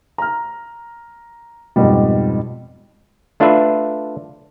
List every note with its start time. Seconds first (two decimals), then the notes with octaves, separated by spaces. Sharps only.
0.18 A#5 F6
1.76 F2 G#2 B2 G3
3.40 A3 D4 F4 B4 E5